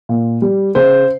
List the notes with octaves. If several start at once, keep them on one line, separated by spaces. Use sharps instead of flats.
A#2
G3
C#3 C5